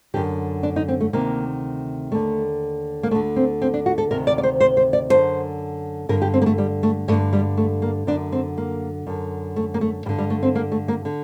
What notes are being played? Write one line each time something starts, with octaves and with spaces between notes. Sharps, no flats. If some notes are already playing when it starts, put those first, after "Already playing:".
F#2 D3 G4
D4
D#4
C4
A3
D2 C3 D#3 A#3
D#2 D3 A3
A#3
D2 D3 A3
C4
C4
D4
F#4
A4
D2 C3 D#3 A#4
D5
D5
C5
C5
C5
D5
F#2 D3 C5
G2 D3 A#4
G4
C4
A#3
A3
G3
A3
G2 D3 A3
G3
A3
A#3
F#2 D3 D4
C4
A#3
F#2 D3
A3
A#3
A3
G2 D3 G3
G3
A3
C4
A#3
A3
A#3
D3